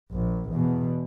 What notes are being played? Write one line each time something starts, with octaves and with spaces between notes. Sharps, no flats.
A#1
E2 B2